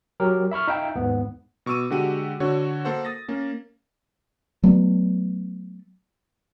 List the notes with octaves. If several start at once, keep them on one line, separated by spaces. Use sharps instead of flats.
F#3 G4 A#4
E5 B5 C#6 F6
D#4 E5 F5 G5
D#2 G#2 B3
B2 C#6 D6 E6 D#7
D3 G#3 F#4 G4 F#5 D#7
D3 F#4 C#5
A#3 A4 C5 F#5
D#6 A6 A#6
A#3 C#4
F#3 A3 B3